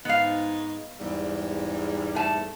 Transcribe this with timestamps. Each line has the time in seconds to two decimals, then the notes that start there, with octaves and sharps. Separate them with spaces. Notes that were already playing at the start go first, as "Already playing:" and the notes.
0.05 G#2 B3 D#4 F5
1.00 E2 G#2 G3
2.15 A3 G#5 A5